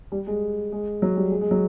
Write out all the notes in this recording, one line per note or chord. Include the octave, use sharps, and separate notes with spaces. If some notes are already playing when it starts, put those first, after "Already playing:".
G3
G#3
G#3
F#3
G3
G#3
G#3
F#3